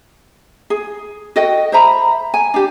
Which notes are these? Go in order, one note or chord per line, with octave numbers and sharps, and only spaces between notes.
G#4
F#4 A4 D#5 G5
C5 E5 A#5 B5
G#5
D4 G4